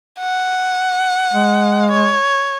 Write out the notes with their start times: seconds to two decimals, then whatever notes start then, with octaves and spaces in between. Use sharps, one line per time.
0.19 F#5
1.33 G#3
1.90 C#5